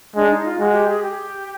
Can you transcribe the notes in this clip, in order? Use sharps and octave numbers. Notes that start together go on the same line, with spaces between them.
G#3 D4
D#4
F4
G#3 F#4
G4
G#4
G4